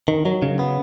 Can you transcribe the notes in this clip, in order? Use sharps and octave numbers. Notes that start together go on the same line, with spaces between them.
D#3
F#3
C#3
B3